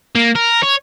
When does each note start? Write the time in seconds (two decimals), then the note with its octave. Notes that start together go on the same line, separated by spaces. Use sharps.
0.16 A#3
0.36 A#4
0.63 C#5